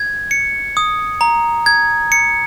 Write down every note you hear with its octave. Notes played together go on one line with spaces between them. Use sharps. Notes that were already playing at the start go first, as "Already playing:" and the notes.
Already playing: G#6
C#7
D#6
A#5
G#6
C#7